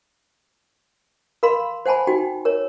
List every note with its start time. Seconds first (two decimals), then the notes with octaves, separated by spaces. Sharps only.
1.43 A#4 F5 B5 C6
1.86 C5 F#5 G#5 A5 B5
2.07 D#4 F#4 G5
2.45 A#4 C#5